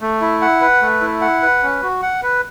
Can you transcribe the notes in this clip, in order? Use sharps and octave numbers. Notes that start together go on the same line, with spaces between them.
A3
E4
F#5
B4
A3
E4
F#5
B4
C#4
F#4
F#5
B4